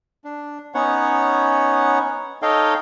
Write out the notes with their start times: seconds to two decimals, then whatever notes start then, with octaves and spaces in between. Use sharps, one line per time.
0.24 D4
0.75 B3 C#4 D#4 C#5 F#5
2.42 D#4 A4 C#5 D#5 F5 G5